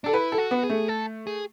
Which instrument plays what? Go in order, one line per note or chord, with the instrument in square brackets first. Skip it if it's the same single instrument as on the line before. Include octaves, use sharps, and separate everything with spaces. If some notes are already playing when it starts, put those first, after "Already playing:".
[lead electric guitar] D4 [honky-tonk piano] A4
[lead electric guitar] E4 [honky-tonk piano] B4
[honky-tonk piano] A4
[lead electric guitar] F#4
[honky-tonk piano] B3
[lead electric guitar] G#4
[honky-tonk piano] A3
[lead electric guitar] A4
G#4